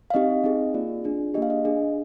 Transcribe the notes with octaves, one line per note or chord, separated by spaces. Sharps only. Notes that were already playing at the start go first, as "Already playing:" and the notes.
F5
C4 D#4 G4 D#5
C4 D#4 G#4
A#3 F4 G#4 D5
D4 F4 G#4
A#3 D4 G4 D#5
F5
D#5
D4 G#4